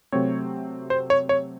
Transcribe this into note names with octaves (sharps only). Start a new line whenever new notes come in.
C3 F#3 A3 C4 C#5
C5
C#5
C#5